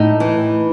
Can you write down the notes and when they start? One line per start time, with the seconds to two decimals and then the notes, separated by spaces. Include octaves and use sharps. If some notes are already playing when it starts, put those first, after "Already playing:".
Already playing: A2 D#4
0.20 E3